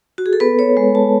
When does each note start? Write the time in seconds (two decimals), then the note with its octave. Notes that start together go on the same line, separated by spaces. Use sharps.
0.18 F#4
0.26 G#4
0.33 A4
0.40 B3 B4
0.59 C#5
0.77 G#3
0.95 A5